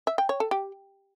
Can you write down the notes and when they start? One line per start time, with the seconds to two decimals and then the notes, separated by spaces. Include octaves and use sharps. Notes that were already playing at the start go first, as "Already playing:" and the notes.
0.07 E5
0.18 G5
0.29 C#5
0.40 A4
0.51 G4